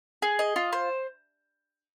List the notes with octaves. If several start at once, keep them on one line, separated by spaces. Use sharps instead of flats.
G#4
D#5
F4
C5